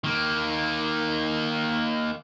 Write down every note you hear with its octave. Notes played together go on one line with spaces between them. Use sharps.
D#3 A#3